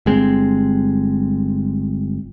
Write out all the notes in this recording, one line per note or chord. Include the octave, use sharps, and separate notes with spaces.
G1 G#3 C4